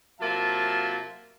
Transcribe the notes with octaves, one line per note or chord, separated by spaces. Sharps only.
C3 F#3 A#3 F4 E5 A5